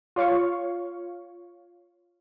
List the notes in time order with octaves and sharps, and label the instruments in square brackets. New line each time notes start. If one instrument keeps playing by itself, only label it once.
[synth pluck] F4 C#5 F5 C#6